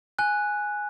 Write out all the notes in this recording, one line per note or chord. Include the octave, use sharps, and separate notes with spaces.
G#5 F#6